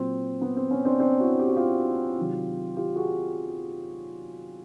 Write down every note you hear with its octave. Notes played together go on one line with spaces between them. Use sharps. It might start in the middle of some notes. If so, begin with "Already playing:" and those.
Already playing: A#2 F#3 C4
B3
C4
B3 C#4
C4 D4
C4 D4
E4 F#4
G4
F#4
F4 G4
C3 D#3 F#3
F4 G4
F#4 G#4